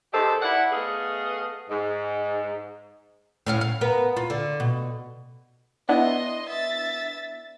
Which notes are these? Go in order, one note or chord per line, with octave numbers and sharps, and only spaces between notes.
D#3 G#3 G4 A4 C5
E4 D5 F#5
A3 B3 G#4 D#5 F5
G#2
A2 C#4 F5
F5
B3 A#4 B4
F4
D3
B2
B3 D4 E4 D#5 C6
E5 A6